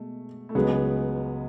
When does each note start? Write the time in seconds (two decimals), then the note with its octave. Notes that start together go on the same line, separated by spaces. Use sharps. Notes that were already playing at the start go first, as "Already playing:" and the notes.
Already playing: B2 G#3 A3
0.49 A3
0.55 C#2 C#3 F#3 G#3 B3